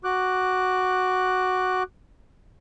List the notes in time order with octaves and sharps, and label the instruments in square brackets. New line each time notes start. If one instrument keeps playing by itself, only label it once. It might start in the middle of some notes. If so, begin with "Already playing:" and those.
[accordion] F#4 D6 F#6